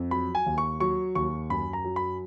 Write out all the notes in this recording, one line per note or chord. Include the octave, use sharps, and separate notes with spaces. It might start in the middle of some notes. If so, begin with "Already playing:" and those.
Already playing: F2
F#3 B5
G#5
D#2
C#6
F#3 C#6
D#2 C#6
F#2 B5
A#5
F#3
B5